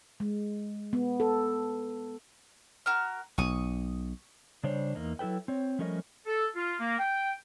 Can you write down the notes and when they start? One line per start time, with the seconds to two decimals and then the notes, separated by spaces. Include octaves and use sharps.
0.20 G#3
0.93 B3
1.20 A4
2.86 F#4 A#4 F6
3.38 B1 C#6 D#6
4.63 C#3 G3 D4 C5 C#5
4.95 E2 A#3 D#4
5.19 F#3 E4 A4 B4 G5
5.48 C4 C#5
5.79 F3 G3 A3 C#4 A#4 D#5
6.26 A4
6.55 F4
6.80 A#3
6.99 G5